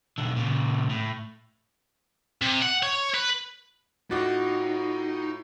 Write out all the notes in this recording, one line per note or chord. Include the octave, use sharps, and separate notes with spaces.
B1 D3
A#2 C#3
A2
C3
F#5
C#5
B4
A2 D#4 F4 F#4 D6 A6